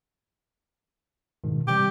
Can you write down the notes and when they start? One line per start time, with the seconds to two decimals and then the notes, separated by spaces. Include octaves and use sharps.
1.44 G#2 B2 D#3
1.68 C3 E3 G3 G4